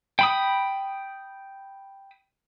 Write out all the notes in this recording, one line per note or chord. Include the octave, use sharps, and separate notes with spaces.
G5 B5 D#6